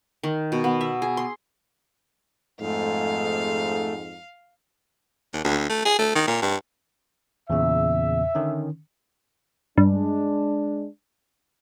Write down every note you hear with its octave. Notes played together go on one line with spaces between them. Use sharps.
D#3
B2
B3
E5
G#4
C6
F2 G#2 A3 F5
D#2
D2
A3
G#4
A3
D#3
A#2
G2
E2 A#2 C#3 E5
D3 D#3 C#4
G2 G#3 D4